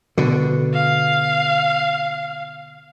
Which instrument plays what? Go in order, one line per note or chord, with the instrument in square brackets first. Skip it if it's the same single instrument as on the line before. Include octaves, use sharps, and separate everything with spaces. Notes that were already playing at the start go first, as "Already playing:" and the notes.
[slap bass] B2 D3
[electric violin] F5